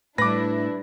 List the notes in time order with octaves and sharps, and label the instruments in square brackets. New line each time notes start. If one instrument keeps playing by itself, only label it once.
[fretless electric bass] A2 [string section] G3 D4 E4 [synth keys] B4 [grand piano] D6 A#6